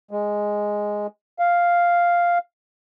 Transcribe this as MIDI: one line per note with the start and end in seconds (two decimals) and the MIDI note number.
0.11 1.07 56
1.39 2.38 77